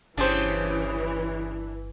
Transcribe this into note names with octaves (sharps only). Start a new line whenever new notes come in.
G1 C#3 E3 C#4 D4 G4 C5